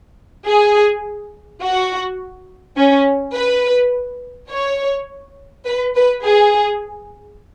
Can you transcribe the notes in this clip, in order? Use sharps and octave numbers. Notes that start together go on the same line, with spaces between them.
G#4
F#4
C#4
B4
C#5
B4
B4
G#4